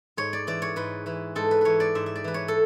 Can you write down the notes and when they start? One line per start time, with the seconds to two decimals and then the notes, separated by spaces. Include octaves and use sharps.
0.17 G#2 C#5
0.33 D5
0.47 E3 D5
0.62 C#5
0.76 G#2 B4
1.06 E3 B4
1.35 G#2 A4
1.51 B4
1.61 E3 B4 C#5
1.80 D5
1.95 G#2 E5
2.06 E5
2.15 D5
2.24 E3 B4
2.34 C#5
2.48 A4